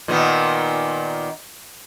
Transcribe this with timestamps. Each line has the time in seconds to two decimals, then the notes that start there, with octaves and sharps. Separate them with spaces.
0.08 A#2 D#3 B3